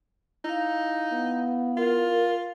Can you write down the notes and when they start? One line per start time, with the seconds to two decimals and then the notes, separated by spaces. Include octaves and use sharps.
0.45 D#4 E4 F5
1.13 B3
1.77 F4 A#4